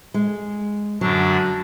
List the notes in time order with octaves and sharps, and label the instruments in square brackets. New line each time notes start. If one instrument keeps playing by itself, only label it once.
[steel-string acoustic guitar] G#3
[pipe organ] F#2 D3 D4 [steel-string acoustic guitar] F#3